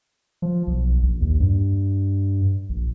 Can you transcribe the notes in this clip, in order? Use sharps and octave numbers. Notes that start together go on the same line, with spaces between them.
F3
B1
A#1
D#2
G2
A#1